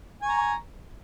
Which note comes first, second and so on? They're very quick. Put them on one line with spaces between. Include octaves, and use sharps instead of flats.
G#5 C#6 A#5